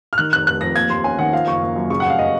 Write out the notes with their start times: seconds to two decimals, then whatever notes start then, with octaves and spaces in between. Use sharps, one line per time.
0.13 F6
0.18 D#3 F#6
0.33 F1 F#6
0.47 F1 F#6
0.61 F2 A#6
0.76 A#3 G#6
0.90 D#2 C6
1.04 C#4 G#5
1.19 D#3 F#5
1.32 F3 F5
1.47 F#1 C#6
1.62 A#3
1.76 F#2
1.90 C#3 C#6
2.00 F1 F#5
2.10 F5
2.19 D#5